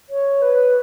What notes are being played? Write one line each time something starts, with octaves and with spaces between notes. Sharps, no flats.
C#5
B4